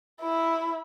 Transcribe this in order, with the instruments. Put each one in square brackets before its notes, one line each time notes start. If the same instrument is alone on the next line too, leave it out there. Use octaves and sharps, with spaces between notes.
[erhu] E4